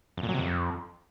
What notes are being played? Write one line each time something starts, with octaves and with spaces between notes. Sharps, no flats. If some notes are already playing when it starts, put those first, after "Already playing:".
F2
A#2
F#3
C3
F2